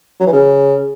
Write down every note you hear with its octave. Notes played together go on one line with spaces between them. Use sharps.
F#3
E3
C#3